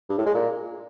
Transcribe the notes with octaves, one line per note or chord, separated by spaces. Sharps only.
G2
A2
G#3
A#2